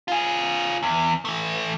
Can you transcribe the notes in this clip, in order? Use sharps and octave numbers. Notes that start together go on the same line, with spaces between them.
F4 G#4
E2
E3 A3